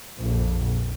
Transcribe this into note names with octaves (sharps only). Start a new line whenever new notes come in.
A#1 F2